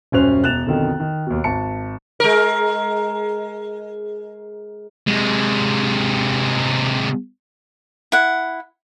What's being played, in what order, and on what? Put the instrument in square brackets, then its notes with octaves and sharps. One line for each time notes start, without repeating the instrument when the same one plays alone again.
[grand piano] D#1 F#2 C#4 C5 F#6 F7
E1 F#6 A6 E7 F7
B1 F2 D3 D#3
D#3
D#2 B2
G#1 A5 C#7
[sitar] G#3 A#4
[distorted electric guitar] C3 G#3
[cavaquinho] E4 F#5